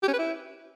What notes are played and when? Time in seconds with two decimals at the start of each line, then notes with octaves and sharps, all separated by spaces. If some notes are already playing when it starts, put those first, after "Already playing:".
0.03 G4
0.08 C#4
0.13 B4
0.18 E4